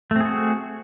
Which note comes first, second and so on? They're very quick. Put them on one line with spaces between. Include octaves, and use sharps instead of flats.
A3 C4 G#4 F#4